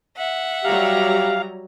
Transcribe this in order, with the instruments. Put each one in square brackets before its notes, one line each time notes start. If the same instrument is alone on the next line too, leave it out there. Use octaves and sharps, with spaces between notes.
[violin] E5 F#5
[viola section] F#3 G3 A#5 [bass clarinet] G4 [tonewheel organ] F5